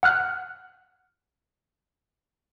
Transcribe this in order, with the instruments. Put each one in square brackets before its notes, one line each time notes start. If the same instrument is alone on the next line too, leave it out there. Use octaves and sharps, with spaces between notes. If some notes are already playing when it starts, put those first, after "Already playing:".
[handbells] F#5 F6 F#6